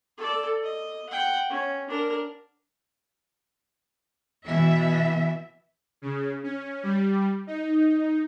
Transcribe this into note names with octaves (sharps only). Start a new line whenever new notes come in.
A4 D5
D#5
F#5 G5
C#4
D4 A#4
B2 E3 E5
C#3
C#4
G3
D#4